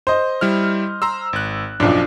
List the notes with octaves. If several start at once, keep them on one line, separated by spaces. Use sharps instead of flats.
C5 D#5
G3 E4 F6
A#5 C6 E6
G#1 F#6
B1 F#2 F3 D4